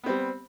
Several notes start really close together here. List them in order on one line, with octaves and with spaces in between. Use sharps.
B3 C4 G3